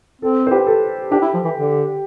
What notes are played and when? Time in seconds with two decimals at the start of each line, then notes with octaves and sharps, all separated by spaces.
0.21 C4 A4
0.47 C5
0.51 G4 B4
0.67 A4
1.11 D4 G4
1.22 E4
1.34 F3
1.44 E3
1.56 D3